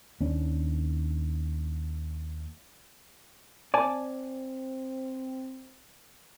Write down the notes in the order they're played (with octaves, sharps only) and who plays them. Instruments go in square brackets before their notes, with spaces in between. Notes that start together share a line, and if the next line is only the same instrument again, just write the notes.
[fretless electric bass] D#2 C#4 D4
[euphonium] C4 [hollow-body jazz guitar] D5 G#5 A5